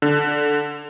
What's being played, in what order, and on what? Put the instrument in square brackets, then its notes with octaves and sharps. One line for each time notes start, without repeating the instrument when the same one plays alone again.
[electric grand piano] D3